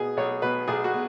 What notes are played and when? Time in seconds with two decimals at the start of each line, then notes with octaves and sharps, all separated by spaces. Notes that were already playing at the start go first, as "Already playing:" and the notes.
Already playing: B2 G#4
0.17 B1 C#5
0.42 B2 B4
0.68 B1 G#4
0.84 F#4
0.93 B2